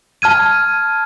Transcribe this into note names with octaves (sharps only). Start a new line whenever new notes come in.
A5 F6 G#6 D#7